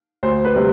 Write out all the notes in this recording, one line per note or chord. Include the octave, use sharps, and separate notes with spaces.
D2 C5
B4
C3 G3